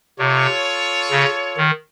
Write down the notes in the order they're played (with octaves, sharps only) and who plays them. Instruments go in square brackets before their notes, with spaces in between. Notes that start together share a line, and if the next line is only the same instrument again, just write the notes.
[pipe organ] C3 [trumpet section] F4 A4 C#5
[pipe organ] C#3
D#3